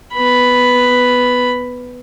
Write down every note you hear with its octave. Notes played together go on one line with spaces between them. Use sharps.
B3 B5